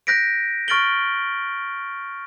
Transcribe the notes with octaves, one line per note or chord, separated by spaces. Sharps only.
F#6 G6 A#6 B6 D7
C#6 F6 A6 D7 F#7 G7